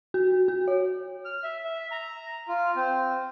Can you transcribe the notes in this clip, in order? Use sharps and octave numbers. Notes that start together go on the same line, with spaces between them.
F#4
F#4
C#5
F6
E5
E5
A#5
F4
C4